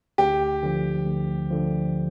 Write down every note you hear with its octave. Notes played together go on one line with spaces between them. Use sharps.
D2 G4
D3 F3
D2
D3 F3